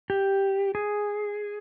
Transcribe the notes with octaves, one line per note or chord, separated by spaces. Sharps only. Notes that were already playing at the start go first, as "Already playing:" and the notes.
G4
G#4